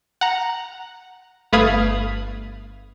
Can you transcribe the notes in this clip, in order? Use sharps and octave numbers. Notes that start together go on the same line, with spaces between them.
F#5 A#5
G1 A3 B4 F5 D#6 G#6